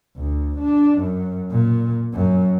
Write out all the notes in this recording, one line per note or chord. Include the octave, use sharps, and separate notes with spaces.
D2
D4
F#2
A#2
F#2